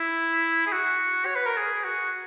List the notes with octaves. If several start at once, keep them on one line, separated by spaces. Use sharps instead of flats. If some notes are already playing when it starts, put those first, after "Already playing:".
Already playing: E4
G#4
F#4
C#5
B4
A#4
G#4
F#4